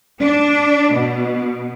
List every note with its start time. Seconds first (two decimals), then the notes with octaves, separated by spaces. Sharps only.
0.20 D4
0.93 B2